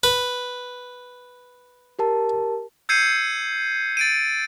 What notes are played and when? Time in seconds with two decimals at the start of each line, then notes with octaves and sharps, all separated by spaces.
0.03 B4
1.99 G4 A#4 A5
2.89 E6 G6 G#6 C7 C#7 D#7
3.97 A6 D7 D#7